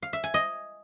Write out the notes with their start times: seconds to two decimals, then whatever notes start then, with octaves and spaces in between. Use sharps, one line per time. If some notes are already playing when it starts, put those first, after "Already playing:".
0.02 F5
0.13 E5
0.24 G#5
0.34 D#5